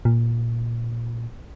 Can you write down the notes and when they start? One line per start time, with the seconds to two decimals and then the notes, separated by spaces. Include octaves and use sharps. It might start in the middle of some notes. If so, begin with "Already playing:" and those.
0.05 A#2